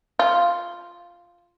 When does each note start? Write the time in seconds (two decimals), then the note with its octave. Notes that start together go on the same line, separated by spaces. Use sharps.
0.19 F4